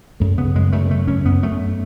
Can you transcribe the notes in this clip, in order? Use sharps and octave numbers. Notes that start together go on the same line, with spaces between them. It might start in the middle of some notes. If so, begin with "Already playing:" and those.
F#2 A3
C#3 B3
F#2 G#3
F#2 A3
C#3 A3
F#2 C#4
F#2 B3
F#2 A3